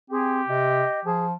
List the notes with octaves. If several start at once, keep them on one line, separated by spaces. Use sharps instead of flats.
C4 G4 G#4
C3 D#5
F3 G#4